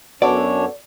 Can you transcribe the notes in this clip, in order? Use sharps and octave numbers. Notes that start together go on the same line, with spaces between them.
F#2 B3 D4 F#4 A4 C#5 D5